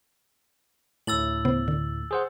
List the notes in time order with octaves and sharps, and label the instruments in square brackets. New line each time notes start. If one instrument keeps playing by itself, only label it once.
[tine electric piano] D2 A2 [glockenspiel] E6 A6 F#7
[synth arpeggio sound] C#3 B3 C5
D3
[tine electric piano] G#4 C5 F#5